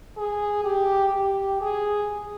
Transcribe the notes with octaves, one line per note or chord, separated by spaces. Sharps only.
G#4
G4
G4
G#4